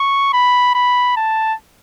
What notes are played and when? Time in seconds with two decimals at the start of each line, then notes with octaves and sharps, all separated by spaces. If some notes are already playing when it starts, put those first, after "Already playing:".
Already playing: C#6
0.34 B5
0.75 B5
1.17 A5